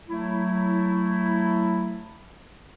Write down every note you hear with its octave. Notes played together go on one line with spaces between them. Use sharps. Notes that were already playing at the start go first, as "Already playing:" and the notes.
F#3 A3 E4